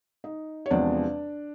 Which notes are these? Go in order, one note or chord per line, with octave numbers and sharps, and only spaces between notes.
D#4 D#5
C#5
E2 C3 F3 G#3 D4 D5